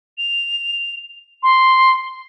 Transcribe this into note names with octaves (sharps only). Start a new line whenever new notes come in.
F7
C6